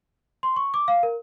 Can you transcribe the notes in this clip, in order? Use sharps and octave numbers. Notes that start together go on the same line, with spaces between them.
C6
C#6
D6
F5
A#4